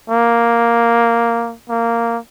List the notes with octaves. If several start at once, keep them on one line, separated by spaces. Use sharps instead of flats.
A#3
A#3